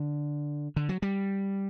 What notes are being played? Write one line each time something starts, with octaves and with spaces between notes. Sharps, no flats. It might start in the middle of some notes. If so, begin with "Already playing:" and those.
Already playing: D3
D3
F#3
G3